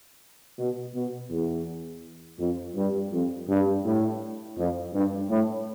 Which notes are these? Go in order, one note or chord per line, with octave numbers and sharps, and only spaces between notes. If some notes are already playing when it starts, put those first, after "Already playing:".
B2
B2
E2
F2
G2
F2
G2
A2
F2
G2
A2